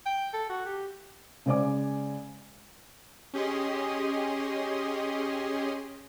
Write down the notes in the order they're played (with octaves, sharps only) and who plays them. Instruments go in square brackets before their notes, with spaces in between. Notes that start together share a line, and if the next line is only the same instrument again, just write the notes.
[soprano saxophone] G5
A4
F#4
G4
[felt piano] C#3 G#3 C5 D5 G#5 D6
[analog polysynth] C#4 G4 G#4 D#5 C6